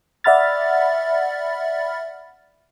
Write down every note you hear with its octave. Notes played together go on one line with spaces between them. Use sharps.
D5 E5 F#5 B5 F6 A6